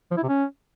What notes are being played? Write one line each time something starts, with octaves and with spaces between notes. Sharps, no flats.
F3
E4
C3
C#4